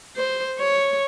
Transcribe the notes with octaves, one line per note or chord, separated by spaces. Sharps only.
C5
C#5